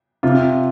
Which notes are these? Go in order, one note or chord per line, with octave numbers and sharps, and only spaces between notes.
C3 F4